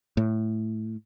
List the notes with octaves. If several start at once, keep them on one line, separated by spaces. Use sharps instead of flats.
A2